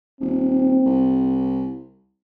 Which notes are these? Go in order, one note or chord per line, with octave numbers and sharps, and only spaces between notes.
D#1 C4
C2